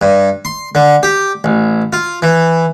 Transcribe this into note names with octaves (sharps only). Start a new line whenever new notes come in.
G2
C6
D3
G4
A1
F4
E3